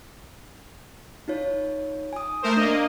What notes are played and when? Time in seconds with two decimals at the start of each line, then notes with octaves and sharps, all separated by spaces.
1.28 D#4 F4 C#5
2.13 G#5 D#6
2.42 A3 A#4 C5
2.57 A#3 D4 D#5